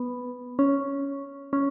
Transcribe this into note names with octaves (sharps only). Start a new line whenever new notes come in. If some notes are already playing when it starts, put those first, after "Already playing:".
Already playing: B3
C#4
C#4